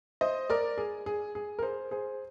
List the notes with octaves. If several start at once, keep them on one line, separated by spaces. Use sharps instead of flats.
C5 D#5
A#4 D5
G#4
G#4
G#4
A#4
G#4 C5
G#4 C5